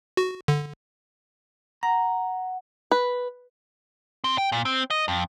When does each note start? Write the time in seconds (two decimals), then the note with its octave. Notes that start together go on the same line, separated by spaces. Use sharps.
0.17 F#4
0.48 D3
1.83 F#5 A#5
2.91 B4
4.24 C4
4.38 G5
4.52 A#2
4.65 C4
4.91 D#5
5.08 F2